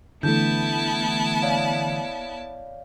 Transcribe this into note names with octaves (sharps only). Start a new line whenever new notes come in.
D3 E3 A3 B3 E4 A5 G6
C#5 D5 F5